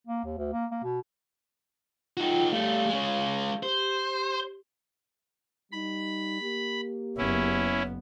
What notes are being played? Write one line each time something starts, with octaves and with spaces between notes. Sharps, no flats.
A#3
D#2
D2
A#3
A#3
B2
D#4 F4 F#4 G5
G3 A3 F5
G#3 C#4
G4 C5
G3 D#4 B5
A#3 G4
F#1 B3 C#4 E4